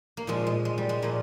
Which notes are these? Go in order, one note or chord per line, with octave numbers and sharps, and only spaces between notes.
A#3
A#2 F3 G#3
G#3
G#3
G3
G#3
A#2 F3 A#3